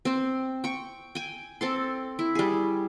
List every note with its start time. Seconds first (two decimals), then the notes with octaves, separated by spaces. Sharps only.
0.05 C4 C5
0.64 G5 C#6
1.15 G5 G#5
1.61 C4 A4 C6
2.19 E4
2.35 G3 G#4